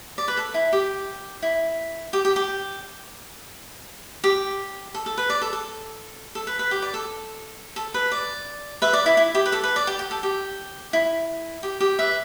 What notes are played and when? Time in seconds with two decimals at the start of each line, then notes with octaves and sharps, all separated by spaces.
0.18 D5
0.28 B4
0.37 A4
0.54 E4
0.72 G4
1.42 E4
2.13 G4
2.25 G4
2.36 G4
4.24 G4
4.94 A4
5.06 A4
5.18 B4
5.30 D5
5.42 A4
5.53 A4
6.35 A4
6.47 B4
6.59 B4
6.71 G4
6.82 D5
6.94 A4
7.76 A4
7.94 B4
8.12 D5
8.82 B4 E5
8.93 D5
9.06 E4
9.17 E4
9.35 G4
9.46 B4
9.52 A4
9.64 B4
9.76 D5
9.87 G4
9.99 G4
10.11 A4
10.23 G4
10.93 E4
11.63 G4
11.80 G4
11.99 B4 E5